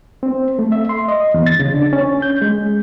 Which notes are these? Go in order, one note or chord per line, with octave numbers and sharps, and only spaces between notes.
C4
A3
E5
C6
D#5
E2
A6
C#3
D4
C#4
G6
G#3